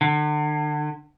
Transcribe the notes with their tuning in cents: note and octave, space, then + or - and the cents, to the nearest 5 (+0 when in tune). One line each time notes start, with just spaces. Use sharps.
D3 +35